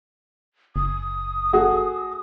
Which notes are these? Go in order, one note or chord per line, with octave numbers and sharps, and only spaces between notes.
F#1 D#6
A3 F#4 G#4